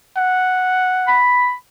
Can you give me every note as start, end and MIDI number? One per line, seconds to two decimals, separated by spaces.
0.17 1.21 78
1.07 1.53 83